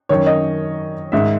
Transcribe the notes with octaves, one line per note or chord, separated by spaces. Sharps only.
F#2 D#3 C#5
D#5
G#2 D#3 E5